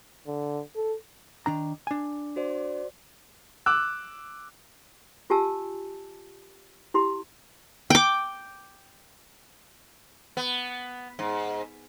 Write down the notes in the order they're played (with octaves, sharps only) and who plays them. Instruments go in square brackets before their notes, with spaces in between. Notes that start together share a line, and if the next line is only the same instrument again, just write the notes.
[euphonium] D3
A4
[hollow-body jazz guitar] D#3 D4 A#5
D4 G#5
[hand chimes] F#4 C5 D5
[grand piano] D6 E6 F#6
[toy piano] F4 G4 G#5 A5 E6
E4 G4 C6
[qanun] G5 D6
[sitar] B3
G#2